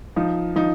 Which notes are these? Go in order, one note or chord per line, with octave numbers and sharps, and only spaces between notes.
F3 D#4
F3 D#4